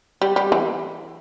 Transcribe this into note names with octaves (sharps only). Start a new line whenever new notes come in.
G3
G3
E3